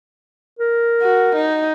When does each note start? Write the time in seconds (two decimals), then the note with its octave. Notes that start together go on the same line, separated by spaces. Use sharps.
0.59 A#4
1.02 F#4
1.36 D#4